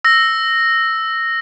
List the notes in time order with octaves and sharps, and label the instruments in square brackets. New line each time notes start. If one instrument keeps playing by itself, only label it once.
[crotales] E6 A#6